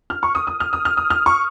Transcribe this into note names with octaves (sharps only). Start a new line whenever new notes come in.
F6
C#6
D#6
D#6
F6
D#6
F6
D#6
F6
C#6